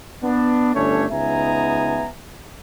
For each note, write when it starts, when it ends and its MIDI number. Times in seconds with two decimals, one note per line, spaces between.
0.22 0.73 59
0.22 0.73 62
0.74 1.05 31
0.74 1.05 57
0.74 1.05 61
0.74 1.05 62
0.74 1.05 73
1.10 2.07 37
1.10 2.07 59
1.10 2.07 63
1.10 2.07 76
1.10 2.07 80
1.10 2.07 82